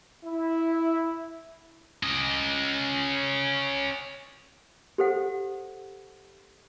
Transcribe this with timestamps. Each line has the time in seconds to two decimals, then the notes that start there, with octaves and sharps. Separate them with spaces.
0.25 E4
2.03 C#4 D#5
4.98 G4 A4 C5 F#5